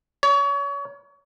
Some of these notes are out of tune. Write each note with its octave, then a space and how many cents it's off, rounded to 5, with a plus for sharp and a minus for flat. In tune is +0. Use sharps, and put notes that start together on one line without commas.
C#5 +30